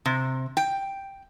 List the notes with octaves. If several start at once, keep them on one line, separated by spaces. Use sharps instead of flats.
C3
G5